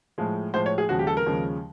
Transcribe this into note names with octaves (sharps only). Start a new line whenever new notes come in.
A2 F3 G#3
A2 F3 G#3 C5
C#5
G#4
D#2 C#3 F3 G#3 F#4
G4
A4
A#4
D#2 C#3 F3 G#3